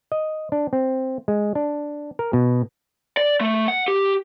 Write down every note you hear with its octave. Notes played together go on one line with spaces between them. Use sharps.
D#5
D4
C4
G#3
D4
A#4
B2
D5
A3
F#5
G4